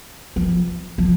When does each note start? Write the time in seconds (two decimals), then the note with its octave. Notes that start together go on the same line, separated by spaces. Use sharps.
0.36 F3
0.98 F3